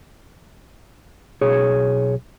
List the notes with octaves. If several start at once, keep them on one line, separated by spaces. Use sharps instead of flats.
B1 G#4 C#5